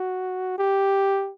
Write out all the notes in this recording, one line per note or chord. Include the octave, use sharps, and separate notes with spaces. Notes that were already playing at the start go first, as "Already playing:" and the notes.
Already playing: F#4
G4